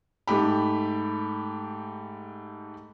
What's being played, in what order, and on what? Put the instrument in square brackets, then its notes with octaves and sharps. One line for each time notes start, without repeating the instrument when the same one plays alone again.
[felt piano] G#2 A3 G4 B5